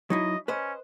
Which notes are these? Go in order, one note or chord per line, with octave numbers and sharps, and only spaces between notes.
F#3 D#4 E4 D#5
C#4 B4 C5 D#5